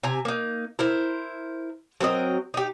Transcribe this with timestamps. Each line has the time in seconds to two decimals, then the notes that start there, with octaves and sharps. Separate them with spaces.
0.03 C3 G#5 A#5
0.25 A#3 D#4
0.79 E4 A#4 C5
2.00 F#3 C4 A#4 D#5
2.54 D#4 G4